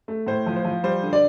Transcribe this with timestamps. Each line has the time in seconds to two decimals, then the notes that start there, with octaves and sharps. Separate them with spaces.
0.08 A3
0.27 A2 C5
0.46 F3
0.56 C5
0.64 F3
0.83 G3 C5
1.03 D3
1.13 D5